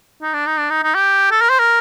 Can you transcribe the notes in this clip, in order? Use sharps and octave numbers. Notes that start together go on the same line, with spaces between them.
D#4
D4
D#4
D4
D#4
D#4
G4
A4
A#4
C5
A#4